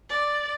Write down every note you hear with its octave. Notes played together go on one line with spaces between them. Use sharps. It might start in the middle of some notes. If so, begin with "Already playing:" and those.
D5